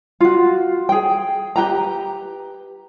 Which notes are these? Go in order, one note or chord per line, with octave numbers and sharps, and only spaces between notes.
F4 F#4
G#4 G5
G4 B4 G5 A#5